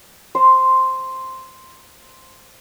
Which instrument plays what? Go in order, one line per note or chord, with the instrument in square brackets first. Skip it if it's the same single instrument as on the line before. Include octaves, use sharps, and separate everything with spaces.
[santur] C5 A#5 C6